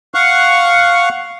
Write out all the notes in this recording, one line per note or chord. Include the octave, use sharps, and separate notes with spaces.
F5 F#5 C#6